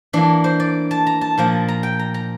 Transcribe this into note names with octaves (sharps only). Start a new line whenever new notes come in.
E3 A#3 D4
C5
D5
A5
A#5
A5
A#2 F3 A#3
A#5
G5
A#5
A#5